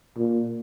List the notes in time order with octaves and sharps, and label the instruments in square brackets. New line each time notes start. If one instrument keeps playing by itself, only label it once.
[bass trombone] A#2